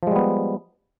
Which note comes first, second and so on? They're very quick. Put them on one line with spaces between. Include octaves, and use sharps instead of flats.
F3 G#3 G3 B3